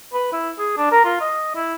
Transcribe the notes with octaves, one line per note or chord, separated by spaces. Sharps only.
B4
E4
G#4
D4
A#4
F4
D#5
E4